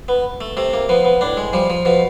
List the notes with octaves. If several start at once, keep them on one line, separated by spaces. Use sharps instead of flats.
B3
A3
C3 A3
A#3
F3 B3
B3
A2 D4
G#3
F3 G3
F3
B2 F3